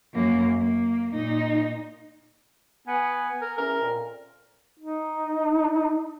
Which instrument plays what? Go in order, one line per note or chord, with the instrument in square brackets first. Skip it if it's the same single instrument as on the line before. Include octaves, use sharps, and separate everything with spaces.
[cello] F#2 A#3
A#3
A#2 D#4
[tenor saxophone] B3 [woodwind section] G#5
[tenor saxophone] A#4
[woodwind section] E2 E3 C#4 [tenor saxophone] A#4
[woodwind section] F2 A#2
[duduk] D#4